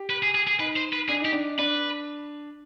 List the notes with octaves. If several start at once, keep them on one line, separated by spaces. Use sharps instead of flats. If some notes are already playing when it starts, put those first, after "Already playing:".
Already playing: G4
B4
G#4
G#4
G#4
D#4 B4
C5
B4
D4 G#4
D#4 G4
D4
D4 B4